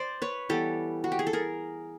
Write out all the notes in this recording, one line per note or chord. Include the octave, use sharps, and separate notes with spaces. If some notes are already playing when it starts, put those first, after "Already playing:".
Already playing: C5 D5
B4 C#5
E3 G3 B3 G4 A4
F#4
G4
G#4
A4
G#4 A#4